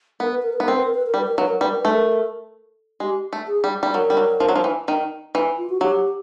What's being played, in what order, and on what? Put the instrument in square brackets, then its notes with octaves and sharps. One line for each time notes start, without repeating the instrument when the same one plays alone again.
[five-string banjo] B3 [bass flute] A#4
[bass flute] B4
A#4
B4
[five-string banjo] B3
[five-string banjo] C4 [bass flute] A#4
[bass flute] B4
A#4
B4
A#4
[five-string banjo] G3
[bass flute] B4
A#4
[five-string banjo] F#3 [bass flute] B4
[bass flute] A#4
[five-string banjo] G3 [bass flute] B4
[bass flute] A#4
[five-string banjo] A3 [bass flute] B4
[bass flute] A#4
[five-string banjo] G#3 [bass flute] G4
[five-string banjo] A3
[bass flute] G#4
[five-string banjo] G3
G3
[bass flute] B4
[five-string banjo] F#3 [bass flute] A#4
[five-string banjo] G3
F#3
F3
F#3
F3
E3
D#3
E3
[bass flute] F4
F#4
[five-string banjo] F#3 [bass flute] G4